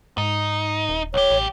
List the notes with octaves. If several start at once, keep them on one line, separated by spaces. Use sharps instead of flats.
G#2 D#4
D#1
B1 G4 C#5
A1